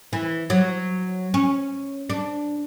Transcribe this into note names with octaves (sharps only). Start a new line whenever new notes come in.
E3
F#3
C#4
D4